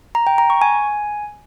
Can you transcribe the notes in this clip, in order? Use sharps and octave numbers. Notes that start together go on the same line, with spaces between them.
A#5
G5
A#5
C#6
G#5